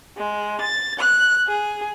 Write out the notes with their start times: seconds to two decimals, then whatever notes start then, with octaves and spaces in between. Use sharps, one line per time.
0.17 G#3
0.60 A6
0.99 F#6
1.47 G#4